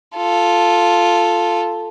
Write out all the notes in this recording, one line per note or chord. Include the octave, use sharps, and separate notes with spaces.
F4 A4